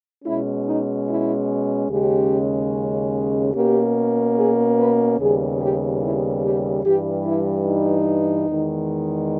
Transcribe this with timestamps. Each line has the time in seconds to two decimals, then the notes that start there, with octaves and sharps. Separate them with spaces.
0.24 B2 G#3 C#4 E4
0.65 D#4
1.07 E4
1.89 D#2 C#3 G#3 C#4 G4
3.54 B2 A#3 C#4 G4
4.36 G#4
4.77 B4
5.18 D#2 C#3 G3 B3 G#4
5.60 G4
6.01 E4
6.42 G4
6.83 G2 E3 G3 G4
7.25 E4
7.65 D#4
8.48 E2 D#3 G#3